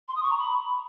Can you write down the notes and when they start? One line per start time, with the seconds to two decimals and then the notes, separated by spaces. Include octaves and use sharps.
0.08 C6
0.16 D#6
0.23 C#6
0.30 A#5
0.38 B5